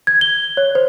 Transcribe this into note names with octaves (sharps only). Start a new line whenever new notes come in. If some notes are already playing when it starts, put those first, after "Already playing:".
G#6
G7
C#5
C5